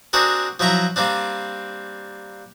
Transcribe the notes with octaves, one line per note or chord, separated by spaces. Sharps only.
C4 D4 F#4 G#4 A#4
F3 F#3 E4 E5 A#5
G3 A#3 C4 D4